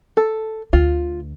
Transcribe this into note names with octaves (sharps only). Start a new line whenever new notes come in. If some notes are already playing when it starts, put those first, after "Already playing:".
A4
D2 F4